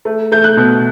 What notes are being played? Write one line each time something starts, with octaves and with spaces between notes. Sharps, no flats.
A3
A3 G6
F#6
B2